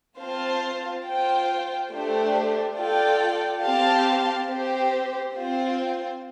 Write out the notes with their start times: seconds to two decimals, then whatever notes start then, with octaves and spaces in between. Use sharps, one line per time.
0.19 C4 F4 C5 F5 A5
1.05 F4 C5 G5
1.91 A3 D4 G4 C5
2.76 F4 A4 D5 G5
3.63 C4 G4 C5 F5 A5
4.48 C4 G4 C5
5.34 C4 F4 C5